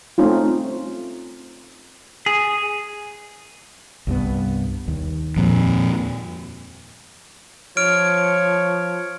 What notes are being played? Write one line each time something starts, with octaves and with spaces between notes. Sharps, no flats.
A3 C4 C#4 D#4 F4
G#4
C2 G2 B3
D#2
F2 A#2
F3 C#5 F6 D7